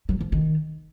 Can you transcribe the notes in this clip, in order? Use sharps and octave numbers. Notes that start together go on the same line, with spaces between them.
F#3
F3
D#3